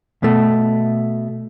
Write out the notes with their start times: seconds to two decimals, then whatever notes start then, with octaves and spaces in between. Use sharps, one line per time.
0.23 B2 A3